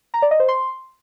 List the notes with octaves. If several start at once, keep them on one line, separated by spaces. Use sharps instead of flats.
A#5
D5
D#5
C5
C6